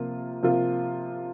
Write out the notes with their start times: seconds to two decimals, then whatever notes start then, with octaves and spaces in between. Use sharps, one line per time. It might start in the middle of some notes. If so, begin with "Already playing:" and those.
Already playing: C3 F3 A#3 F4
0.43 C3 F3 A#3 F4